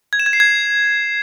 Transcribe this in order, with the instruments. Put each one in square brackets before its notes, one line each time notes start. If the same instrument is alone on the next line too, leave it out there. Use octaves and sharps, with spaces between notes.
[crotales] G#6
E7
G#6
C7
G#6